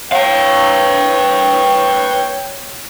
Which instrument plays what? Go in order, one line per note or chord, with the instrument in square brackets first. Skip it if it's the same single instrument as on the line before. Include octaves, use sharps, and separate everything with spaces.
[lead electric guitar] B4 F5 [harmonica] C#5 G5